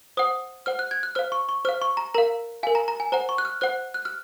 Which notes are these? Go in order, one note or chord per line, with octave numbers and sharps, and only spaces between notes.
C5 F#5 D#6
C5 F#5 F6
F#6
G#6
F#6
C5 F5 F6
C#6
C#6
C5 F5 F6
C#6
A#5
A#4 F5 A#5
A#4 F5 G#5
A#5
A#5
G#5
C5 F#5 A#5
C#6
F#6
F6
C5 F#5 F#6
F#6
F6